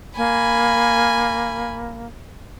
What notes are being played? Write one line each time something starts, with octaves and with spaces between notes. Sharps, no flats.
A#3 G#5 B5